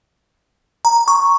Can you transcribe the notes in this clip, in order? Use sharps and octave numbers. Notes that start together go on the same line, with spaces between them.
A#5
C#6